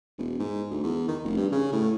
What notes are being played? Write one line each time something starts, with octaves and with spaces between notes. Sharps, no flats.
E1
G#2
D2
E2
D#3
F1
G2
C#3
A2